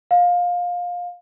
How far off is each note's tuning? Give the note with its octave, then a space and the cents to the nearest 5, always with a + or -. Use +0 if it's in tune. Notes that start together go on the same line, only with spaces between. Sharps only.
F5 +20